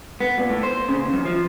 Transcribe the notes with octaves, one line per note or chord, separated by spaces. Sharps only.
B3
A#2
A2
C5
C#3
D#2
F#2
F3